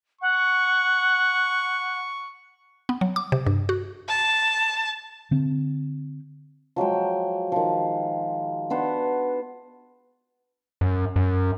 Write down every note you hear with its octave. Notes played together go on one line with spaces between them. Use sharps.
F#5 C#6
B3
F#3
D6
C3
G2
F#4
A5
D3 C4
F3 F#3 G#3 G5
D#3 F3
B3 D4 C5 F#5
F#2
F#2